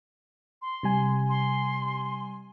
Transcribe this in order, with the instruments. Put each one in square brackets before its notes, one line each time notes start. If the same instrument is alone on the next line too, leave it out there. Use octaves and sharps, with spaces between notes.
[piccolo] C6
[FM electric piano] C3 G3 G#5
[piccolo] C6